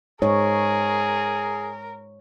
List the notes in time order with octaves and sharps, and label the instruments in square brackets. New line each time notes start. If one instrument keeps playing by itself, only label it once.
[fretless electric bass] G#2 [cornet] G#4 [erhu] A#4 [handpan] C#5